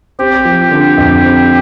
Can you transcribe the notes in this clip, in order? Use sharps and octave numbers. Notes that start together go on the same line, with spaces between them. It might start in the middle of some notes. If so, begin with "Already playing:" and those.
C4 G4
F3
D3
F2
C4